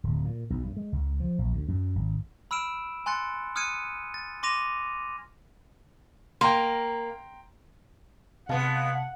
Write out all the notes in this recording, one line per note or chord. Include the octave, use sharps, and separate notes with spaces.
D1
A#2
B1
G2
G#3
C#2
F3
A#1
D2
F#2
G#1
B5 E6 F6 D7 E7
G#5 C6 F#6 A6 C#7
D#6 F6 F#6 G#6 C#7 D#7
A6
C6 D6 A#6 D#7 F7
A#3 G5 A#5 C6
C3 G#3 B3 F5 F#5 A5